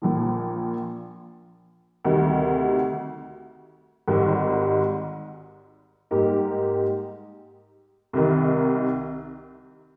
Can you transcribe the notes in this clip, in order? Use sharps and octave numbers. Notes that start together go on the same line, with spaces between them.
A#1 A#2 F3
D2 C3 D#3 G3
G#1 G#2 D#3 G3
G#2 G3 A#3 D#4 G4
C2 C3 D#3